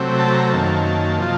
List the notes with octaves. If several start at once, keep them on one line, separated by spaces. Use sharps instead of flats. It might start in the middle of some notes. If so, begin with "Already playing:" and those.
Already playing: C3 F#3 A3 C4
A5
A#5
A5
F#2 D#3 A#3
C3 F3 A#3 F4